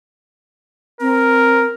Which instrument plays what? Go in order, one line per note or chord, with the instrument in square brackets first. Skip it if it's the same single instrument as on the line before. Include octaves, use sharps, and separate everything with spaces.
[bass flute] C4 [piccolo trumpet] A#4